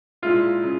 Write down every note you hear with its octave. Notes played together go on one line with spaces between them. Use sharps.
A#2 G#3 E4 F4
C#3